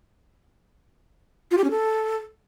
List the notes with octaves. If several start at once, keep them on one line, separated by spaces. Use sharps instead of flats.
F4
G4
C#4
A4